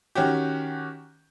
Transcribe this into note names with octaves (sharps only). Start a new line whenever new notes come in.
D#3 C#4 F#4 G4